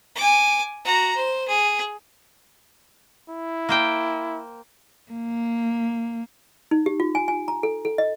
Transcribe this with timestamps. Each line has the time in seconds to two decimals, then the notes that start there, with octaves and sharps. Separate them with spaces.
0.16 G#5 D6
0.85 F#4 A#5
1.15 C5
1.48 G#4
3.29 E4
3.69 A#3 C5 G5
5.12 A#3
6.71 D#4
6.86 G4
7.00 F4
7.15 G#5
7.28 G#5
7.48 A#5
7.63 A4
7.85 A4
7.98 D#5